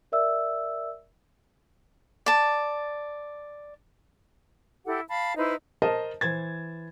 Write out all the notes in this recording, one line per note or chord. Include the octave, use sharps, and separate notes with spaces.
A#4 D5 E5 E6
D5 A5
E4 G4 A4 F#5
F5 A5 B5
D#4 E4 B4 C5
A#4 C5 D#5 A5
E3 C5 G#6 A6